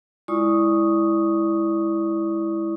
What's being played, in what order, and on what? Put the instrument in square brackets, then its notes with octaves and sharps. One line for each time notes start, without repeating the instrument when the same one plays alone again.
[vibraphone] G#3 E4 F4 D5 C#6 D#6